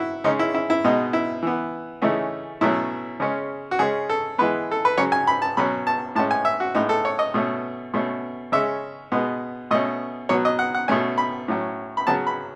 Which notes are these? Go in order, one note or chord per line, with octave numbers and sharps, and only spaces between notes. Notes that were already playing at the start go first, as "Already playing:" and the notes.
Already playing: E4 F#4
C#3 G#3 C#4 D#4
E4
E4
E4
B2 G#3 B3 D#4
E4
E3 B3
C#3 E3 A3 C#4 D#4
B2 F#3 A3 C#4 E4
C#3 G#3 C#4
F#4
C#3 G#3 C#4 G#4
A4
E3 G#3 B3 B4
A4
B4
C#3 F#3 C#4 C#5
G#5
B5
A5
B2 F#3 C#4 B5
A5
A2 G#3 C#4 A5
G#5
E5
F#4
A2 G#3 B3 D#4
A4
C#5
D#5
B2 A3 C#4
B2 A3 C#4
C#3 G#3 C#4 E5
B2 G#3 B3
B2 A3 C#4 D#5
B2 F#3 B3 C#5
D#5
F#5
F#5
B2 A3 C#4 G#5
B5
A2 F#3 C#4
B5
C#3 F#3 B3 A5
B5